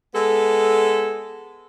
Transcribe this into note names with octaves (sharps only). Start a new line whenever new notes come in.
G#3 B3 A4